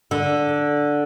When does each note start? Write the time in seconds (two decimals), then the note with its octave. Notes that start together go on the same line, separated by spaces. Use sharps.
0.11 D3